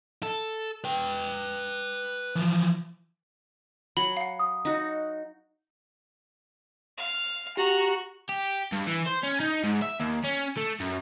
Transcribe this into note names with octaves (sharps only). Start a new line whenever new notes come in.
A4
B4 G5
E3 F3
F#3 B5 F#7 G7
F5 F#5
D#6
D#4 F#4
F5
F#4 G4 A#5
G4
G2
E3
C5
C#4
D#4
G#2
E5
D#2
C#4
A3
F#2